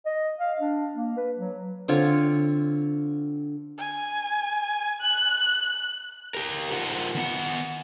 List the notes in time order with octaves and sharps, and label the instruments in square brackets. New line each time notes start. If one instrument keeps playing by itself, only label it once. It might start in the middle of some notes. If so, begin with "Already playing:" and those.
[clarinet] D#5
F5
D4
A#3
B4
F#3
[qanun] D3 C4 F4 C#5
[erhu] G#5
F#6
[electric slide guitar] G4 A#4
D#4 F4 A#4 C5 F#5
D#3 B3 F#5